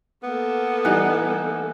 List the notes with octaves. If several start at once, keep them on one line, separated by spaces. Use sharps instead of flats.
A#3 B3 A4
E3 G3 D#4 G#5 F#6